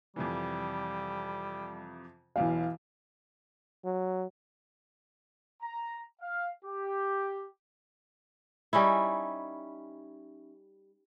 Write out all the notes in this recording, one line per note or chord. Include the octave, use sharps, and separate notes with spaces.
F2 C3 E3 G3
E1 E2 E3 F#3 F5
F#3
A#5
F5
G4
G3 C#4 D#4 E4